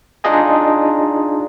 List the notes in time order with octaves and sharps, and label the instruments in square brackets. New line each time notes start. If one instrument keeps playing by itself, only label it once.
[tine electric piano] D4 D#4 F4 G#4 D#5 G#5